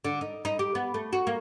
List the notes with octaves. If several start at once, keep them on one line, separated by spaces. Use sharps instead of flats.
D3
D#4
D#4
G4
B3
A3
F#4
A#3